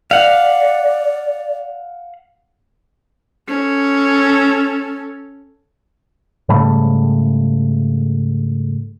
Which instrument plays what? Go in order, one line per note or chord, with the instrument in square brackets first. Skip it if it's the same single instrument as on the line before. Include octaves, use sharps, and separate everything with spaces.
[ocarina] D5 [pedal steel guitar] F5 F#5
[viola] C#4 A4
[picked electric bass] G#2 C#3 G3 A3